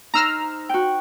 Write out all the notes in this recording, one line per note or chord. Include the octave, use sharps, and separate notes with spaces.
D#4 C5 A#5 E6 F6
F#4 G5